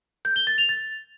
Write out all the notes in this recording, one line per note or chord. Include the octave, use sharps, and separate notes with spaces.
G6
G7
A6
F7
A6